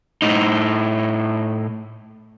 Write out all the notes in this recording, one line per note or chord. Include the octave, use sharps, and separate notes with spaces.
A2 D#4